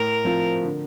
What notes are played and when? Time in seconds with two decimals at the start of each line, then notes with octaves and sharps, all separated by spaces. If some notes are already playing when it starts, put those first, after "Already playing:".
Already playing: A2 A#4
0.25 F3 C4 F4
0.63 D3